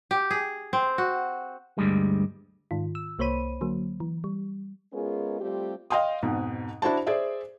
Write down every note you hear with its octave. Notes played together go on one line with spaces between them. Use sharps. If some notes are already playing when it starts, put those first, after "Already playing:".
G4
G#4
C4
F#4
D2 G2 G3 G#3
G#2 D#3 F4
E6
C2 A#3 C5 C#5 B5 D#7
D3 F#3 A#3
E3
G3
G#3 B3 C#4 F4 G#4 A#4
G3 A3 C4 F4 G4
D#5 F5 G5 C6 D#6
F2 G#2 B2
D4 E4 F#4 C5 A5
G#4 C5 D5 E5